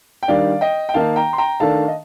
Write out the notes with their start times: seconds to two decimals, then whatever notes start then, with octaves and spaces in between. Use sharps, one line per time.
0.23 G5
0.28 D#3 G3 D4 D5 F5
0.61 D#5 G5
0.89 G5
0.94 D#3 A#3 D#4 F5 A5
1.16 G5 A#5
1.33 C6
1.38 G5 A#5
1.60 D#3 A3 D4 F5 A5
1.88 D#5